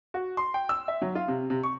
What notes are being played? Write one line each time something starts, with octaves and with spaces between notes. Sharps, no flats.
F#4
C6
G5
E6
E5
F#3
F4
C3
C3
C#6